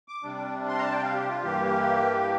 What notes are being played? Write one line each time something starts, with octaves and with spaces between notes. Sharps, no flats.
D6
C3 G3 D4
C6
A#5
A5
G5
F5
G4
F4
G2 E3 A#3 G4